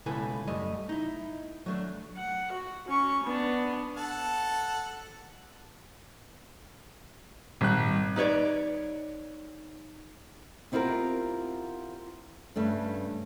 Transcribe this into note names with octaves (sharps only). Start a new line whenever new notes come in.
C#2 B2 E4 A4 B4 G#5
F#2 G3 A3 D#5
D#4 E4
F#3 A3 D4
F#5
F#4
C#4 C#6
B3 D4
A4 F#5 A5
G#1 A#2 G3 F#6
D#4 B4 C#5 D5
B3 C4 E4 F4 G4 A#4
G2 C#3 A3 D4